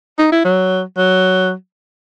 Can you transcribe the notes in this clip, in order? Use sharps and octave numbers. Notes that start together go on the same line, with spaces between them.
D#4
E4
F#3
F#3